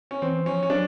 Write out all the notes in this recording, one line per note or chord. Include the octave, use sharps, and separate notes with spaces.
C#4
E3 C4
F3 C#4
C#4
F#3 D4